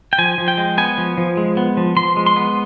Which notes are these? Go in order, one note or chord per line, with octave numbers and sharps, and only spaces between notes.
G5
F3 G#5
F3
G5
G#3
B3 G#5
F3
F3
G#3
B3
F3
F3 C6
G#3
C6
B3